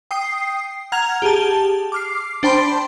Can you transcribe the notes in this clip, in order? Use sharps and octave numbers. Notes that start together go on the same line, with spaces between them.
G5 D#6 C7
F#5 A#5 F6 G#6 F7
G4 G#4 A5
D6 F6 C7
D4 C5 G5 A5 B5 C6